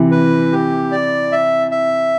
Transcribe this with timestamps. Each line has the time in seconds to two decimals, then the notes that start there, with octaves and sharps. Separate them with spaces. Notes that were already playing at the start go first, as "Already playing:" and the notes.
Already playing: C3 E3
0.11 B4
0.52 G4
0.92 D5
1.32 E5
1.71 E5